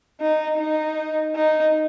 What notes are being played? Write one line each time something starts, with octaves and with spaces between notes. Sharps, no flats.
D#4
D#4
D#4